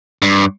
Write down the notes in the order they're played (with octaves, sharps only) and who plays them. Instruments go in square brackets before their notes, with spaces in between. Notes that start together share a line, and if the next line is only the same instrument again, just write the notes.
[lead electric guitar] G2